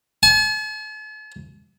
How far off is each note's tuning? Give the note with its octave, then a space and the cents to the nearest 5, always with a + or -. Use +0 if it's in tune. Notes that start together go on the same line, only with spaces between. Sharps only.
A5 -45